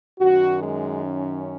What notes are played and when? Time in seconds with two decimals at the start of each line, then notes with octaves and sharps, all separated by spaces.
0.20 F#2 D#3 F#4
0.62 G#3
1.04 C#4